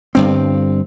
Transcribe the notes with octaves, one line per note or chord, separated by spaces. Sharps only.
G1 G2 C4